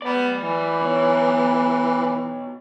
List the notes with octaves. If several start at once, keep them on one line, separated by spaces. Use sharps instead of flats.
B3 D5 B5
E3
B2 C#5